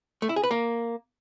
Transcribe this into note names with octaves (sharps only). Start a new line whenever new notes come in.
A3
E4
G#4
B4
A#3